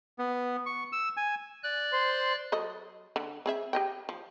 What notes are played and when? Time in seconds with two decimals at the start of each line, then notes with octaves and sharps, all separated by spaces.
0.19 B3
0.66 C#6
0.92 E6
1.17 G#5
1.63 D5 F#6
1.93 C5 C6
2.52 F#3 A4 D#5
3.16 D3
3.46 C4 G#4 E5
3.73 G4 D#5 G5
4.09 F3